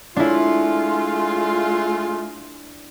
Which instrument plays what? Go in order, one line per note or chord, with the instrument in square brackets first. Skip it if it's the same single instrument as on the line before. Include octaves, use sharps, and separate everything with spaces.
[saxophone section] G#3 A3 F4 [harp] D4 E4